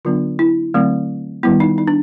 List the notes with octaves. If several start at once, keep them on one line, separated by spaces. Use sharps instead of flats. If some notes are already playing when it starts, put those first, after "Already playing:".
D3 F#3 B3 D4 F4
E4
D3 F#3 A3 C4
D#3 G3 B3 E4
D#4
D#4
D4